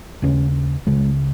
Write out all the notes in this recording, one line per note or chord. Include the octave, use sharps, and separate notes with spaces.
D#2 C#3 C#4
C#2 C#3 G#3